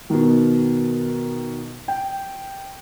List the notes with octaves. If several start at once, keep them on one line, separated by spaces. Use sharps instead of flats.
B2 D#3
G5